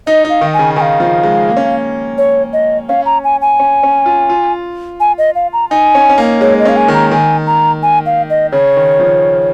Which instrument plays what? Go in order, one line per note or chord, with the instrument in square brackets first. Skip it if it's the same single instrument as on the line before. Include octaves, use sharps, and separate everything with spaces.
[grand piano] D#4 [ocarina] D#5
[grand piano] D#4
[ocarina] F5
[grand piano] D#3
[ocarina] G#5
[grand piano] C#3
[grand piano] D#3 [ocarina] G#5
[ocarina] F5
[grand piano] F3
G#3
A#3
C#4
A#3
[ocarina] C#5
D#5
[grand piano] C#4 [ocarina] F5
[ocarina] A#5
G#5
G#5
[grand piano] C#4
C#4
F4
F4
[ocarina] G#5
D#5
F5
A#5
[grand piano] D#4 [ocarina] G#5
[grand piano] C#4
C#4
A#3
[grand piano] G#3 [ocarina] C#5
[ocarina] D#5
[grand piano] C#4 [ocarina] F5
[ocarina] G#5
[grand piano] D#3
[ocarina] A#5
[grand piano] D#3 [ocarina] G#5
[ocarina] A#5
G#5
F5
D#5
[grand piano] C#3 [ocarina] C#5
[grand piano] D#3
F3